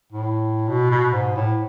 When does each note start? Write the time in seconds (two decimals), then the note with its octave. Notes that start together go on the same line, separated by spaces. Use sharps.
0.13 A2
0.69 B2
0.91 B2
1.13 G#2
1.36 A2